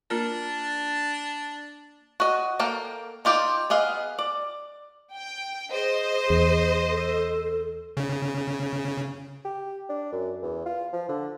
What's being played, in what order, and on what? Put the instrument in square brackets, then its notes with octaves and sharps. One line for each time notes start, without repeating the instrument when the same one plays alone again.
[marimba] A#3 F4 A#4 [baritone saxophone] D4
[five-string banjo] F#4 D#5
A#3 A4 A#4 G5
D#4 F4 G4 D5
B3 G#4 D#5 F5
D5
[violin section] G5
[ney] G#4 [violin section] C5 D#5
[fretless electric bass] E2
[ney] A4
[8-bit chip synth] C#3
[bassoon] G4
D4
F#2
E2
F4
F3
D3